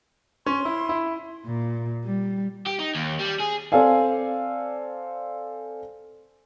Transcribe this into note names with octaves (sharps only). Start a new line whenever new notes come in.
C#4 C6
E4
E4
A#2
G3
G4
D#4
D#2
G3
G#4
C4 A4 D5 F5 G#5